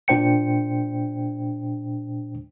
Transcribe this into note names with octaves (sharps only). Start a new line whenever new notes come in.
A#2 D4 C5 G5 C#7